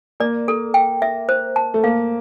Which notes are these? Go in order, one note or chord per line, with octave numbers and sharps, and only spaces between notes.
A#3 D5
A4
G5
E5
C5
A5
A3
A#3 F5